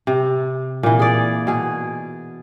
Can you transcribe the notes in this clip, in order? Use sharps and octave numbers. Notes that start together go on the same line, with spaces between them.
C3
A#2 E3
G#4 D5
B2 G#4